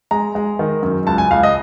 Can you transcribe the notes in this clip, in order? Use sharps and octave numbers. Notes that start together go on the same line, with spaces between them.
G#3 A#5
G#3
D#3
F#2
C#2 A5
G#5
C#2 F5
D#5